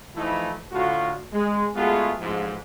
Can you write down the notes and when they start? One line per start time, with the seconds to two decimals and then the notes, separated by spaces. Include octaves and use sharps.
0.16 E3 F3 A3 D#4 E4
0.72 A2 D3 F4 F#4
1.33 G#3
1.76 G#3 A3 B3 F4 F#4 G#4
2.20 A1 G#2 F3